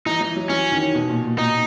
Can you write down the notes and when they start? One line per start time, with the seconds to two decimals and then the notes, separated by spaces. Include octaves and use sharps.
0.06 E3 D#4
0.21 E3
0.36 F#3
0.49 E3 C#4
0.72 D#3
0.95 B2
1.09 A#2
1.23 A#2
1.38 A#2 D#4